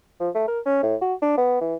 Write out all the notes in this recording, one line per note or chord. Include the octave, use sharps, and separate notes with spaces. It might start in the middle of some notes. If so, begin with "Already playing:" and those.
F3
A3
A#4
C#4
A2
F#4
D4
B3
E3